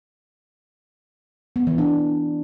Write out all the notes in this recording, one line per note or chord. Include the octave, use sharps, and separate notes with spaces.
B3
E3
D4